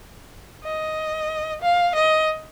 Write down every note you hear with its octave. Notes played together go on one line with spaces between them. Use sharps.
D#5
F5
D#5